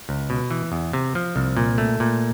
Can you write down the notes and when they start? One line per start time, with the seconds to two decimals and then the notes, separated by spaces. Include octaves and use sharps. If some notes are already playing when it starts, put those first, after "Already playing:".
0.09 C#2
0.30 B2
0.51 E3
0.72 E2
0.93 C3
1.15 F3
1.36 C2
1.57 A#2
1.78 A3
2.00 A#2